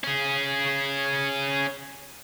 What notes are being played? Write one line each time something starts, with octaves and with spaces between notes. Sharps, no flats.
C#4 G#4